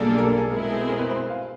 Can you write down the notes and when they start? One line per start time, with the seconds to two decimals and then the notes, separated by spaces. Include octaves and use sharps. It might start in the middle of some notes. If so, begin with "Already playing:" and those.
Already playing: B1 A#2 G3 A#3 D4 G#4 A4
0.11 G#4
0.18 A#4
0.23 A4
0.37 G#4
0.50 B2 G#3 C4 E4 G#4 A#4
0.89 A#4
0.99 B4
1.10 C5
1.30 F5